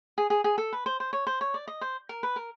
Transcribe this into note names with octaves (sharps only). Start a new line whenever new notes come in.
G#4
G#4
G#4
A4
B4
C5
C5
C#5
C5
C#5
D5
D#5
C5
A#4
B4
A#4